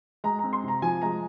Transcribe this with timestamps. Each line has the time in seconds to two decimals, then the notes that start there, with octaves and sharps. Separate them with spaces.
0.24 G#3 A#5
0.39 C4 A#5
0.53 C6
0.64 C3 A#5
0.82 F3 G#5
1.02 G#3 A#5